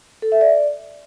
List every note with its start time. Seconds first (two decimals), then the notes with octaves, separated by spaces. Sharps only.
0.22 A4
0.32 E5
0.41 D5